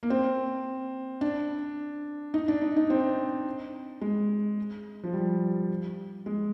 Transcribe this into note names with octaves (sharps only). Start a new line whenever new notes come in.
A#3
C4
D4
D#4
D4
D#4
D#4
C4
G#3
F3
G3
G#3